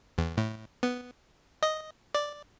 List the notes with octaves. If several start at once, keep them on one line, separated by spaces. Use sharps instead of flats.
E2
A2
B3
D#5
D5